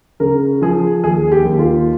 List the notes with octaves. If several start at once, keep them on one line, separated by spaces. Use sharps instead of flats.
C#3 A#4
F3 G#4
D#2 G#4
G4
D#2
F4